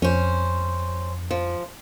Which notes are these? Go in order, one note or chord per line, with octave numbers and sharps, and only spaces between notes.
F2 C#4 C5
F3